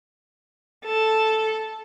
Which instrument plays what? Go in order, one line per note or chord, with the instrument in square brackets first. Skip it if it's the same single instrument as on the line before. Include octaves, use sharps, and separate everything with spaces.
[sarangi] A4